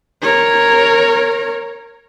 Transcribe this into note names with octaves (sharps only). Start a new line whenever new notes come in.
A#4 C#5